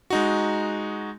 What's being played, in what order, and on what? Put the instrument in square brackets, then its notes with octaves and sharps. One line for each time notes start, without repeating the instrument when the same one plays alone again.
[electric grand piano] G#3 D#4 F#4